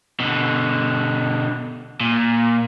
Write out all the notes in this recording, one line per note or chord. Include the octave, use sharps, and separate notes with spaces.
B2 D3
A#2